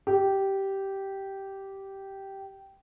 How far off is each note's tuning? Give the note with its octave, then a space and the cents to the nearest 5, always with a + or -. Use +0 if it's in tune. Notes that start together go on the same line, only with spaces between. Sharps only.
G4 -10